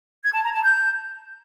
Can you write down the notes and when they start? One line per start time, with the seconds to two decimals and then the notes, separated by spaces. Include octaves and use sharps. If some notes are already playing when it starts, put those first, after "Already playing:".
0.23 G#6
0.33 A5
0.43 A#5
0.53 A5
0.64 G6